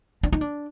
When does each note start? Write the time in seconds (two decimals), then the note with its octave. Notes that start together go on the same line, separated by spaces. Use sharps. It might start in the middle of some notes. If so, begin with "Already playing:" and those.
0.23 D4
0.33 D#4
0.41 D4